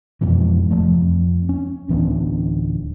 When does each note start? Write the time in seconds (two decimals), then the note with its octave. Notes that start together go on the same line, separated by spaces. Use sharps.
0.21 F2 G#2 B2 E3
0.71 F1 D#2 F3 A3
1.02 F2
1.49 C#4
1.89 D1 E3 B3 D4